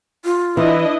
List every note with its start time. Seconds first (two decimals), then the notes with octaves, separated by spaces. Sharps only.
0.25 F4
0.57 E3 D4 E4 D#5